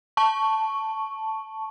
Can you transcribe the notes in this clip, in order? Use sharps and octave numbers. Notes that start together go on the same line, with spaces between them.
A5 C#6